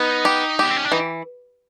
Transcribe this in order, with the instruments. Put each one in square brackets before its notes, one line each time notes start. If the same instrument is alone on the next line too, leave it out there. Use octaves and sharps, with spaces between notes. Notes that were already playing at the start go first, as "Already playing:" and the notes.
Already playing: [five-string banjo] B3 [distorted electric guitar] D#4
[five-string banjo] G4
[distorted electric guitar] B3 [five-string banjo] G4
[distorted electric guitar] C4
C#4
D4
[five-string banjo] E3 [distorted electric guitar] D#4